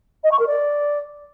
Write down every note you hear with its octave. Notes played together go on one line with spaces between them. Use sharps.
D#5
C#6
A#4
D5